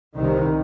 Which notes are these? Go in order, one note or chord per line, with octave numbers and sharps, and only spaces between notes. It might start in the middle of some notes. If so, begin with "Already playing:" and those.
C2 C3 D#3